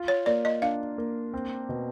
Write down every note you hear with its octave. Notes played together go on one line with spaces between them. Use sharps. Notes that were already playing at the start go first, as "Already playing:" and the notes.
Already playing: F4
C#5
A#3 D5
D#5
D4 F5
A#3
C4
B2